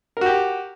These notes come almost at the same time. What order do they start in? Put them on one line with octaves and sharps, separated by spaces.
A#4 F#4 G4